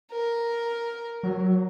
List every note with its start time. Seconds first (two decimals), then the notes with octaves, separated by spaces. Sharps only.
0.11 A#4
1.23 F#3